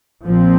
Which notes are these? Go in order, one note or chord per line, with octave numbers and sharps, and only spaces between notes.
A#1 A#2 F3 C4